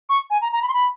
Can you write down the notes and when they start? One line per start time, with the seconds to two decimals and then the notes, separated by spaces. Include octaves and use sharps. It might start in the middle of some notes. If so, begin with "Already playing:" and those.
0.09 C#6
0.30 G#5
0.42 A#5
0.52 A#5
0.62 B5
0.68 C6
0.74 B5